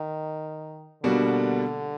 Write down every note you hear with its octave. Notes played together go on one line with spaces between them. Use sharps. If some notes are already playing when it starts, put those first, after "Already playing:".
Already playing: D#3
B2 D3 G3 A#3 D4 F#4